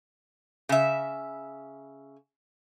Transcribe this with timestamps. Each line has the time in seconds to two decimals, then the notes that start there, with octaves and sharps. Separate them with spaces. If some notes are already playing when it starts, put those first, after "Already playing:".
0.69 C#3 E5